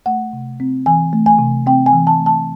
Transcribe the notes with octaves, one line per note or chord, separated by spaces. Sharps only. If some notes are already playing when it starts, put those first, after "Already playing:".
A3 F#5
C3
C4
E3 G#5
A3
G#5
C3
C4 G5
G#5
E3
A5
A3
A5